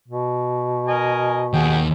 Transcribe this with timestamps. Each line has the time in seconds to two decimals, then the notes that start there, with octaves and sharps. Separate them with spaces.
0.08 B2
0.88 A#4 D#5 G#5
1.53 D#2 G#4 F#5 G5